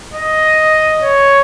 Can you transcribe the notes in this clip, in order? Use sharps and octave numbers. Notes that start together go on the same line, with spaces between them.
D#5
C#5